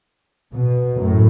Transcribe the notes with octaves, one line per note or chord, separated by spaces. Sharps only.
B2
F#2 A2